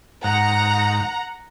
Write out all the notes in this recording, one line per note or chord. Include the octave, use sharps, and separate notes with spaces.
G#2 F#5 A#5